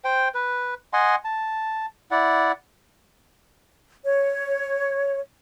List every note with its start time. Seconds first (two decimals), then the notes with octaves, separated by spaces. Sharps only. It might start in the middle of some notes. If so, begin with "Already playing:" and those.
0.04 C5 G5
0.34 B4
0.93 D#5 F#5 G#5 C6
1.25 A5
2.11 E4 D5 F#5
4.03 C#5